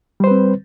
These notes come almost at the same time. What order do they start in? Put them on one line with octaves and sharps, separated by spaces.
G3 C5 B4 C4